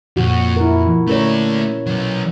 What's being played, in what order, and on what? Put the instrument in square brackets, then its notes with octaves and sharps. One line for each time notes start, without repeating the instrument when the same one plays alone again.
[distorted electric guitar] F2 [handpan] A#2 F#4
[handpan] E4 A#4
[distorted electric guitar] A3 D5 [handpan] C#4 A#4 C#5
[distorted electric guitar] B1 F#3